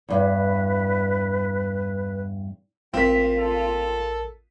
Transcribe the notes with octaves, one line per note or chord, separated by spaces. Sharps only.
E2 G2 B4
A1 C4 F4 A#4 B6
A4